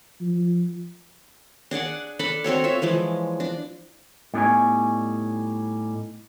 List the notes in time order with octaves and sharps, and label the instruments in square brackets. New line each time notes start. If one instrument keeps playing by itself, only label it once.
[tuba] F3
[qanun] D4 G#4 D5 F#5
D4 A4 B5
C4 F#4 A4 C#5
F4 C#5 E5
E3 F3 G#3
D4
[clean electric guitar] A2 G3 B3 D#4 C#5 G#5